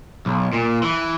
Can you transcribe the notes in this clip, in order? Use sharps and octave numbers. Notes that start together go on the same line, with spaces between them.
B1
A#2
E3